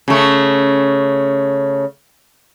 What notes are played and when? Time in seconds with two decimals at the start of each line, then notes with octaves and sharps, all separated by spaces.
0.08 C#3 A3